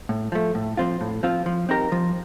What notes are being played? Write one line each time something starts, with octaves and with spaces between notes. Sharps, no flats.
A2
F3 A3
A2
F3 C4 F4
A2
F3 C4 F4
F3
C4 D#4 G4 A#4
F3